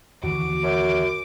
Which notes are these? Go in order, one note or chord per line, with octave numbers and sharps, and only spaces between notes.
D#2 D3 E3 F#4 D6
F#2